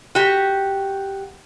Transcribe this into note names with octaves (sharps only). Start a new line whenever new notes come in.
F#4 G4